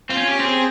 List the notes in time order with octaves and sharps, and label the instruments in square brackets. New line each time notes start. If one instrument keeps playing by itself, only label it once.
[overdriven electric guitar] C4 [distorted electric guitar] F4
[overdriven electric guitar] C#4
[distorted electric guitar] G4
[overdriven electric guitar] C4
[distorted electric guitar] G#4